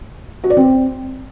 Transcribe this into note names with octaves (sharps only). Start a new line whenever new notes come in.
F#4
D5
C4